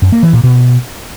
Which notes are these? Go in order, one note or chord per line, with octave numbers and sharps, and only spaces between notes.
F#2
A#3
E3
A#2
B2